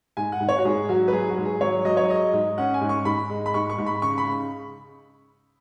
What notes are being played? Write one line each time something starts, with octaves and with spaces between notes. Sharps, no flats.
G#2 G#5
F#5
G#2
C#5
F#4
G#2 G#4
F#3 F#4
B4
F#3 G#4
F#4
G#2
G#4
F#3 C#5
F#3 D#5
C#5
G#3 D#5
G#2
C#4 F#5
G#5
G#2
C#6
G#2 B5
G#3
B5
G#2 C#6
C#6
G#2
B5
C#3 C#6
B5
C#3